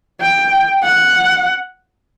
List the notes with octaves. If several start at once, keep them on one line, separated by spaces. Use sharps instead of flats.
G5
F#5